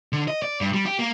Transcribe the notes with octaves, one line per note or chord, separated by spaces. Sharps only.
D3
D#5
D5
G2
G3
G4
A#3